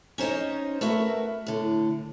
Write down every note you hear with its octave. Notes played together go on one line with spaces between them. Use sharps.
C#4 D#4 C5 C#5 D#5
A3 F#4 A#4 B4 E5
A2 D3